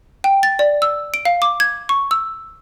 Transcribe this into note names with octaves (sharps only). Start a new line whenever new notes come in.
G5
A6
D5
E6
D7
F5
D6
G#6
C#6
E6